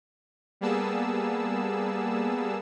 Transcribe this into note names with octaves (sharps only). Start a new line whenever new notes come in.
G3 A#3 B3 G#4 A5 E6